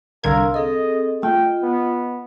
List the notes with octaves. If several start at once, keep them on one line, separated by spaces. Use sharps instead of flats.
C2 D3 A#4 F5 C6 E6 G#6
C4 G#4 A4 D#5
A3 F4 D#5 G5
B3